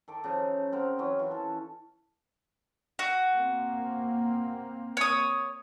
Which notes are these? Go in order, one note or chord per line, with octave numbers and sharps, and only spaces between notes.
D#3 A4 D6
C#3 F3 D#4
C4 A#4 C5 F#5
E3 F#3 C#4
E3 F4
A4
F#4
A#3 C4
C#5 D#6